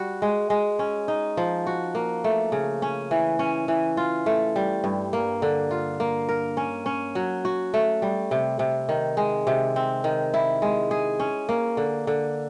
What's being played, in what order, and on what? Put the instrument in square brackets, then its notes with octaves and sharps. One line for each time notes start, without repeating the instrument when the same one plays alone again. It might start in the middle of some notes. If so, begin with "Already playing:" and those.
Already playing: [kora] G3 F#4
G#3
G#3
C#4
D#4
F3
F#4
A#3
A3
C#3
C#4
E3
C#4
E3
F4
A3
G3
G2
A#3
D3
F4
A#3
A#4
C#4
C#4
F#3
F#4
A3
G3
C3
C3
D#3
G#3
C3
C4
D#3
E4
G#3
G#4
C#4
A#3
D3
D3